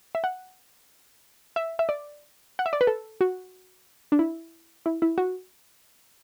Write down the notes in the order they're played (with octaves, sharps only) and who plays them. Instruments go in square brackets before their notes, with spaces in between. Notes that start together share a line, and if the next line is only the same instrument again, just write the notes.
[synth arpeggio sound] E5
F#5
E5
E5
D5
F#5
E5
D5
B4
A4
F#4
D4
E4
E4
E4
F#4